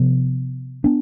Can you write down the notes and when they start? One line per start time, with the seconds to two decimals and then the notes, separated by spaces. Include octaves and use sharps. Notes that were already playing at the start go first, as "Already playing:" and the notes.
Already playing: C3 F3 B3
0.84 B3 D4